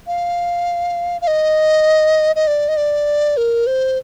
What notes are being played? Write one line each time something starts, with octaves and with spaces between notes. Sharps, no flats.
F5
F5
D#5
D#5
D5
D#5
D5
A#4
C5